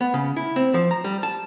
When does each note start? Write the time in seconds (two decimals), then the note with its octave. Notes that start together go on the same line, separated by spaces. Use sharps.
0.01 B3
0.14 C#3
0.37 E4
0.56 C4
0.74 F3
0.91 A#5
1.04 G3
1.23 A5